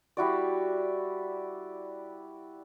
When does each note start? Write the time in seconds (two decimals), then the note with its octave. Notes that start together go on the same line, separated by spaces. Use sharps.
0.17 G3 E4 F#4 D5